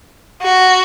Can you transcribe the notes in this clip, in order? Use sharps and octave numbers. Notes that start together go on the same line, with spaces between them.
F#4